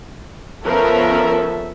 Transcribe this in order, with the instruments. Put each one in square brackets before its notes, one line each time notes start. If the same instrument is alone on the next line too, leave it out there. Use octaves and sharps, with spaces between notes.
[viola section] F3 B3 C#4 [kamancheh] A4 E5 [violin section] A#4